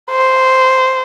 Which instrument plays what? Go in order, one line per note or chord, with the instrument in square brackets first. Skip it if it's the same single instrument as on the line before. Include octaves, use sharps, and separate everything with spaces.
[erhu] C5